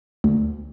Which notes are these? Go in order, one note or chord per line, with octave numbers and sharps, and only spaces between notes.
D2